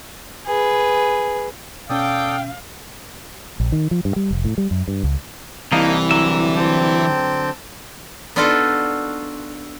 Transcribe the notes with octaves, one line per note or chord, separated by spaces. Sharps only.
G#4 B4
B2 C#4 A4 D5 F5 G5 D#6
A#1
D#3
F3
G2
G3
F1
A2
G3
F#2
G2
C#2
C2 E3 A#3 D4 D#4 D#5 F5 G5
D3 F#3 E5 A#5
C4 G5 A5
B3 D4 D#4 F4 F#4 A4